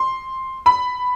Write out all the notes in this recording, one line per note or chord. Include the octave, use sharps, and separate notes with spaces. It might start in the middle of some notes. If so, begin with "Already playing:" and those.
Already playing: C6
B5